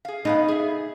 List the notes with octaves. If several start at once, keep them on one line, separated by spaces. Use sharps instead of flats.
G#4 F5
B2 B3 D#4 F5
G#4 E5